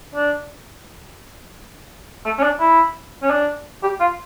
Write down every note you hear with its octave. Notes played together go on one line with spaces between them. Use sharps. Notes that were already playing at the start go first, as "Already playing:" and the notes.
D4
A3
C#4
D4
E4
C#4
D4
G4
F4